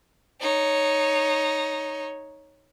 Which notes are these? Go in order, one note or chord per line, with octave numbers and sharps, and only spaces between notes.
D#4 C#5